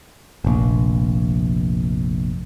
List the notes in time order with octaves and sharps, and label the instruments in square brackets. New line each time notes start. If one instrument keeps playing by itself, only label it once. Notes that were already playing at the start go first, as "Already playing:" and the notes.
[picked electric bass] F1 A#1